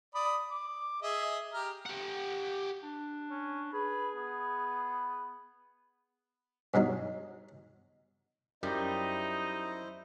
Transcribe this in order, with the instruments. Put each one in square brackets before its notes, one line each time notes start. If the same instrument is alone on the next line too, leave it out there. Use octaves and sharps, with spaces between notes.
[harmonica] D5 B5 D#6
D6
G#4 D#5 E5
G4 A#5 F6
[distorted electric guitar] G4 F#5
[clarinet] D4
[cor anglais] C#4
[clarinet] G#4 [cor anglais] B4
[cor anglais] B3
[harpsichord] G2 B2 F#3 D#4
[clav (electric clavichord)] F#2 G5 A#5 [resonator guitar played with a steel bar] G3 [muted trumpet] D#4 [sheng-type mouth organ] E4 C5 D#5